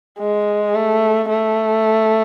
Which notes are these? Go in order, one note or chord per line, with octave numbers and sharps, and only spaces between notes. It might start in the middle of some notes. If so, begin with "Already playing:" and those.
G#3
A3
A3